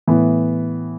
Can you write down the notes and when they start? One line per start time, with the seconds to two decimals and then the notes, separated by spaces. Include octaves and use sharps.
0.07 A2 E3 B3